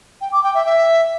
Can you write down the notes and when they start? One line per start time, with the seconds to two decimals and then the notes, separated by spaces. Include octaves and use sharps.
0.21 G5
0.32 D6
0.43 G5
0.55 E5
0.66 E5